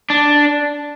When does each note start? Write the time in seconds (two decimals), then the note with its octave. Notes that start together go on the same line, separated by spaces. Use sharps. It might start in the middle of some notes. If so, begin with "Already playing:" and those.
0.10 D4